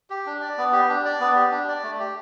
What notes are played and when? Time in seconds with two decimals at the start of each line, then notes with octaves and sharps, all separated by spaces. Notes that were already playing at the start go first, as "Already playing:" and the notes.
0.10 G4
0.26 D4
0.41 D5
0.58 B3
0.72 G4
0.89 D4
1.05 D5
1.20 B3
1.35 G4
1.51 D4
1.68 D5
1.83 A3
1.99 G4